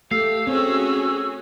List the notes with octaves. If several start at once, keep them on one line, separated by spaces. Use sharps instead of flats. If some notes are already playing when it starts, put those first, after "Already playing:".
A3 G4 F5 E6
C4 C#4 F#4 G#4